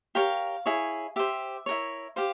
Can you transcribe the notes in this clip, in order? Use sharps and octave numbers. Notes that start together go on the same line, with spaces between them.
G4 A#4 C#5 F5
E4 G#4 C#5
G4 C5 E5
E4 A#4 C#5
G4 C5 F5